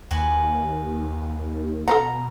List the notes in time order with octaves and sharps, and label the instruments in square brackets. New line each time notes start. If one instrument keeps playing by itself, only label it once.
[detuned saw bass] D#2 [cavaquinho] F#4 B4 G#5
[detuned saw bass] B2 [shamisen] A4 F5 F#5 [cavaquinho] A#5